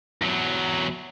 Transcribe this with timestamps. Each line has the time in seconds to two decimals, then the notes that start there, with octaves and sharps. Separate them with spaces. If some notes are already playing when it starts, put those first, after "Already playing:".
0.22 E2 F#3